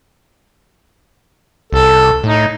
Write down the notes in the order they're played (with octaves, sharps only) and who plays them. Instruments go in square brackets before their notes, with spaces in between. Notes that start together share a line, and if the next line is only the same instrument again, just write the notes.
[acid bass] C2 [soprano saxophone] A4
[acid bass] A2 [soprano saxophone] D#4